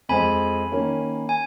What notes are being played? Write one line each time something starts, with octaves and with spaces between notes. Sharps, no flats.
F2 F3 G#3 G#5 B5
D#3 A#3 C#4
G#5